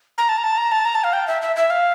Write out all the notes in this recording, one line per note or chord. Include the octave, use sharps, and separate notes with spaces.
A#5
A5
A#5
A5
A#5
A5
A#5
A5
F5
G5
E5
E5
E5
F5